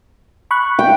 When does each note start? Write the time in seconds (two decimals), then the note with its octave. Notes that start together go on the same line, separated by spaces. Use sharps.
0.51 B5 C#6 F#6
0.79 G5